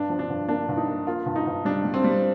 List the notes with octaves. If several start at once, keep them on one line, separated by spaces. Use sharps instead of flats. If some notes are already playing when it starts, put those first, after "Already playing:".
Already playing: G2 D4
F3
D4
G2
A#3 D4
G2
D#4
A#3
A#3 F4
G2
D#4
G2
G3 D4
G3
C4
G3